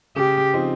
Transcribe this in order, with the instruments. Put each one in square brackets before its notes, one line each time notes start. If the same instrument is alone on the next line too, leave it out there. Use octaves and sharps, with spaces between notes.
[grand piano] C#3 [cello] G4
[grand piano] F3 C4 D#4